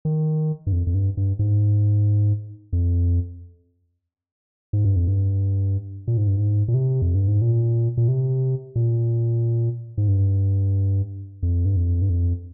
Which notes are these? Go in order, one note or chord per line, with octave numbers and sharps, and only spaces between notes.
D#3
G2
F2
F2
G2
G2
G#2
F2
G#2
G2
F2
G2
A#2
G#2
G2
G#2
A#2
C3
F2
G2
G#2
A#2
A#2
C3
A#2
G#2
G2
F2
G2
F2
G2
F2